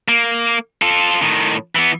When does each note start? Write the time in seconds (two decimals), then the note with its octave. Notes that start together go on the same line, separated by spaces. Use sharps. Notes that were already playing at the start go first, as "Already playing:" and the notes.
0.08 A#3
0.82 F4 A4
1.22 A2 D#3
1.75 E3 B3